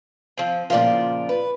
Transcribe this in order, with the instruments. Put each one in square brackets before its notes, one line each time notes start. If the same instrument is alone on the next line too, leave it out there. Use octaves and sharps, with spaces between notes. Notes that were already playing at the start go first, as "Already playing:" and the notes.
[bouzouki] F3 C4
[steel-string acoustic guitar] A#2 C#3 F3 [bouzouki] F4 D5
[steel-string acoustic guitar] B4